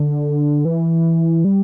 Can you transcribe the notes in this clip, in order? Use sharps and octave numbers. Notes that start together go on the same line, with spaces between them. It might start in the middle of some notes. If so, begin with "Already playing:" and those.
Already playing: D3
E3
G3